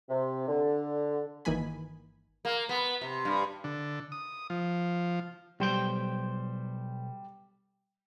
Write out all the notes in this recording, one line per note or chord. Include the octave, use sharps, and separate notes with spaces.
C3
D3
G1 D#3 E3 A#3 G#5 B5
A#3
B3
C3
G2
D3
D#6
F3
B1 G3 C5 G5